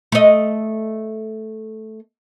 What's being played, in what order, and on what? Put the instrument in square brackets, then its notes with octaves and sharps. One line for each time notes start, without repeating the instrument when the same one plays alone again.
[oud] A3 D#5